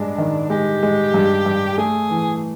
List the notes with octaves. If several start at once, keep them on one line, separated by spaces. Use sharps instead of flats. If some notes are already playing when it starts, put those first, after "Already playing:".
Already playing: G2 G#3 D4
D#3
G#3 G4
G#3
G2
G2
A3 G#4
E3